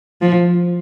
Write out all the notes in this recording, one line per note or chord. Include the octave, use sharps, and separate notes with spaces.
F3